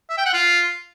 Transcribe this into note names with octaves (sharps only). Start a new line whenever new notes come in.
E5
G5
F#5
F4